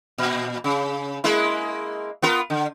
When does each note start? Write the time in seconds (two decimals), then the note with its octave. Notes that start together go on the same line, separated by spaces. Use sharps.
0.18 A#2
0.64 C#3
1.24 G#3 A#3 E4
2.22 B3 F4 A#4
2.50 D3